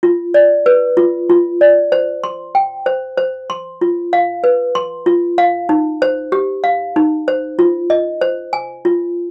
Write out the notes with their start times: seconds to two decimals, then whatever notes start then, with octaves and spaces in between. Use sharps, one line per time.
0.03 F4
0.34 D5
0.66 B4
0.97 F4
1.30 F4
1.61 D5
1.92 C5
2.24 C6
2.55 G5
2.86 C5
3.18 C5
3.50 C6
3.81 F4
4.13 F5
4.44 B4
4.75 C6
5.06 F4
5.38 F5
5.69 D#4
6.02 C5
6.32 G4
6.64 F5
6.96 D#4
7.28 C5
7.59 F4
7.90 D#5
8.21 C5
8.53 G#5
8.85 F4